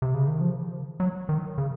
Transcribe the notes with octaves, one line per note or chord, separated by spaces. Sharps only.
C3
C#3
D#3
F3
F#3
D#3
C#3